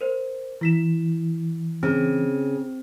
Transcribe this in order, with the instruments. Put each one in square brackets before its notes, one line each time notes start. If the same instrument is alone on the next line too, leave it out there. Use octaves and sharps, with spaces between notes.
[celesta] A#4 C5
[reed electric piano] E3 [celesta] E4 B6 E7
[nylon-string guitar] C#3 [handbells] C4